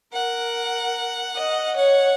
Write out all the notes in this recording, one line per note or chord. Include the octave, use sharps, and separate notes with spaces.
A#4 F#5
D#5
C#5 F#5